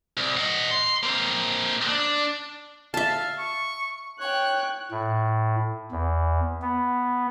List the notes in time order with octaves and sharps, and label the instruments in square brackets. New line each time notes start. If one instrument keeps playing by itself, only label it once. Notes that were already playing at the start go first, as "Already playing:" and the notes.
[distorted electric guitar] C2
D#5 F#5
C6
A#3 C4
D4
[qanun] E5 A5 [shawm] F5
[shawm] C#6
[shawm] C#5 [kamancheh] G5 F#6
[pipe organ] A2
E2
B3